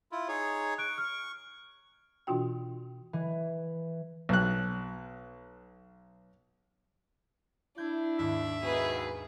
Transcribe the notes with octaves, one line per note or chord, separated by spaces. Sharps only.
E4 F4
D#4 G#4 C#5
C#6 F#6 D7
F6
B2 E3 D4 F4 F#4 G5
E3
B1 F#6
D4 E4 G6 G#6
D#2 G#2 E5
D#2 G#2 B2 C#4 G#4 B4